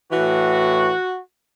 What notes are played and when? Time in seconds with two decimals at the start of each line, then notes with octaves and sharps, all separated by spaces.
0.12 A2 E3 F#4